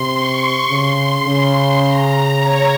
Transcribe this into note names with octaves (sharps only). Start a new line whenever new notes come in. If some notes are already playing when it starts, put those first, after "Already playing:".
Already playing: C3 C6
C#6
C#3 C6
C#3
A#5
C#5